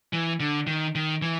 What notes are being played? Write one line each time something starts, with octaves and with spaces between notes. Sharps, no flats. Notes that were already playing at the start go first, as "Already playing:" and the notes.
E3
D3
D#3
D#3
E3